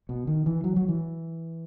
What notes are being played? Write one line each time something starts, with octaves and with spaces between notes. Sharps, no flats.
B2
D#3
E3
F#3
F#3
E3